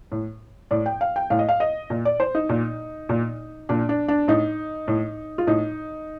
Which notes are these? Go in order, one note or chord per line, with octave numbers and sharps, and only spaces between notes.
A2
A2 D5
G5
F5
G5
A2 F5
D#5
F5
D#5
A#2
D5
C5
D#4
A#2
A#2
A#2 D4
D4
D4
A2 D#4
A2
F4
A2 D#4